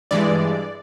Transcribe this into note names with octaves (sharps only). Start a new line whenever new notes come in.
G2 E3 G#3 D5